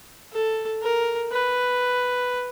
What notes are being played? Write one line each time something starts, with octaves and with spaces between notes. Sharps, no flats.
A4
A#4
B4